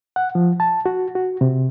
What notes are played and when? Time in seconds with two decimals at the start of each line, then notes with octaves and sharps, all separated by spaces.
0.16 F#5
0.35 F3
0.60 A5
0.86 F#4
1.15 F#4
1.41 C3